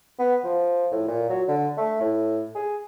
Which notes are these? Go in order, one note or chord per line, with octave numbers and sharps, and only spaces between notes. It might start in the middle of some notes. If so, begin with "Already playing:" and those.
B3
F3
A2
A#2
F#3
D3
A3
A2
G#4